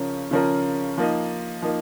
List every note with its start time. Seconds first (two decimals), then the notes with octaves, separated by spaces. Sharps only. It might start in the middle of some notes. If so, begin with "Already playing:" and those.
Already playing: C#3 F3 C#4 A#4
0.31 C#3 F3 C#4 A#4
0.98 F3 A#3 D#4
1.62 F3 A#3 D#4